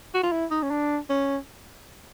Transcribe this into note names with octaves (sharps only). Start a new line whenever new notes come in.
F#4
F4
E4
D#4
C#4
D4
C#4